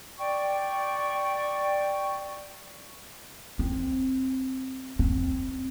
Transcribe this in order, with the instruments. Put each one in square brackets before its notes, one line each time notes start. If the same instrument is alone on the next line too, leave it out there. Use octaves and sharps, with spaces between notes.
[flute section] D5 G5 C#6
[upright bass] C4
C4